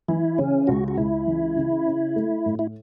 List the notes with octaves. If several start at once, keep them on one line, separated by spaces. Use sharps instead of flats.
E3 E4
C#3 C#4
C#2 F#4
F#4
C#2 E4
E3
C#3
C#4
A3
A2
E4